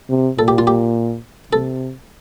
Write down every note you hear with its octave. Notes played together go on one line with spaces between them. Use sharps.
C3
A#2 A4
G4
F4
G4
C3 A4